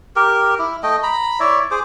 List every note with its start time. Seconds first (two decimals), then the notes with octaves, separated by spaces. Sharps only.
0.16 G4 A#4
0.59 E4
0.83 A3 D#5 G5
1.03 A#5 B5
1.40 E4 C#5 D5 E5
1.71 G#4 C5 D6